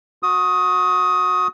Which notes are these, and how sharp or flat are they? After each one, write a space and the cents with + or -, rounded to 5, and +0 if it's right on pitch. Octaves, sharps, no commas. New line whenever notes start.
F#4 -20 D#6 +15